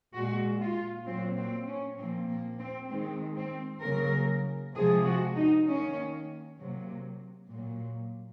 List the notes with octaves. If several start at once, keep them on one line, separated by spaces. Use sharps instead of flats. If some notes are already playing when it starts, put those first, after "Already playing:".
A#2 G#3 F#4
F4
A#2 F#3 A#3 C4
C4
C#4
A#2 F3 A#3 C4
A#3
C4
D#3 G#3 C4
C4
C#3 F#3 A#3 A#4
C3 F3 G#3 G#4
F#4
D#4
D#3 A#3 C#4
C3 F#3 A#3
A#2 F#3 A#3